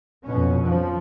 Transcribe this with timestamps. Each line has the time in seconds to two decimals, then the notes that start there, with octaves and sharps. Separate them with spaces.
0.25 F2 B2 C#4
0.62 F3